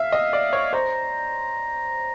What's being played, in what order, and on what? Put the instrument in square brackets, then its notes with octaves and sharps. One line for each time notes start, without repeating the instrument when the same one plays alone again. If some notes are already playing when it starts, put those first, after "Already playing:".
Already playing: [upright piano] E5 [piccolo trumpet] F5
[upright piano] D#5
D5
C#5
[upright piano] C5 [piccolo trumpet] A#5